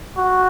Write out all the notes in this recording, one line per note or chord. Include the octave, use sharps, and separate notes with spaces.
F#4